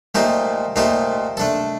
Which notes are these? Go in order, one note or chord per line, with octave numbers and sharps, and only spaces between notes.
A#2 A3 D#4 G4 C5
A#2 A3 D#4 G4 C5
A3 D4 A4